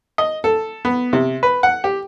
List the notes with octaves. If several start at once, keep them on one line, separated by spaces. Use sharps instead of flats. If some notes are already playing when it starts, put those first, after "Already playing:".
D#5
A4
B3
C3
B4
F#5
G4